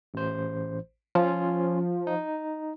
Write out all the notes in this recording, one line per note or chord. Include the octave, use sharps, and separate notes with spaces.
A1 C5
F3 C#4 F4
D#4